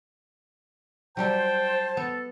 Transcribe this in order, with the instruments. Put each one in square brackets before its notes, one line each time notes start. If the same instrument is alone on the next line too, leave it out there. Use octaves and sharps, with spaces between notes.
[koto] F#3 G3 E5 [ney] C5 [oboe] G5 [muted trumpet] A5
[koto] B3 [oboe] A4